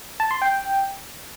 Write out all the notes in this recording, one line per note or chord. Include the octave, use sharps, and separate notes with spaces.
A5
C6
G5